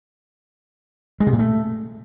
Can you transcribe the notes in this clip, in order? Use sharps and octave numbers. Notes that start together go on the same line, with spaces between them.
G#3
C3
A#2
A3